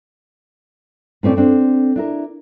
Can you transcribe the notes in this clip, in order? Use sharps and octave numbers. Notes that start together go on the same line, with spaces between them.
A2 C4 C#4 D5
C4 D4 A4 C5
D4 E4 A#4